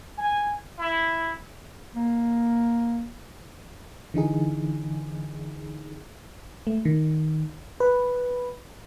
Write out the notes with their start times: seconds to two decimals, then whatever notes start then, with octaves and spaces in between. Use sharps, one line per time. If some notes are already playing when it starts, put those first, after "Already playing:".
0.18 G#5
0.78 E4
1.95 A#3
4.14 D3 E3 D#4 G#4
6.67 A3
6.85 D#3
7.80 B4